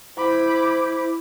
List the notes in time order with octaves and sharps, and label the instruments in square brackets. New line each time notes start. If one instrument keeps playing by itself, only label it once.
[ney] E4 [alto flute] C5 [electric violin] B5 D6